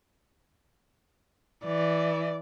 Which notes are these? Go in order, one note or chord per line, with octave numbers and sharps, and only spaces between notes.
E3 D5